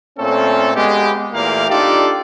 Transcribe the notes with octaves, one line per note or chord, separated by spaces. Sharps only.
A#2 A3 C4 C#4 A4
G#3 B3 G4
E2 A#2 A3 A#3 G4 F5
D4 D#4 F4 G4 A4 D5